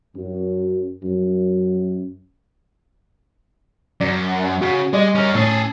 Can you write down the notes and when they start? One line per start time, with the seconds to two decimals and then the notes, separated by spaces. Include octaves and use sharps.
0.16 F#2
1.03 F#2
4.01 F#2 D5
4.61 C#3 F#4
4.93 G3 G#3 D5 D#5
5.15 C#4 A#4
5.35 A2 C#4 G#4 A4